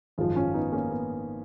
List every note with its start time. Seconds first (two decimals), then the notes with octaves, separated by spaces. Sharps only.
0.18 G#1 F#2 F3 F4 G#4
0.36 C#4 F4
0.54 B3 D#4
0.72 A#3 C#4
0.91 B3